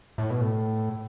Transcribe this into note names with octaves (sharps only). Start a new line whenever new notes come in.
A2
B2
A2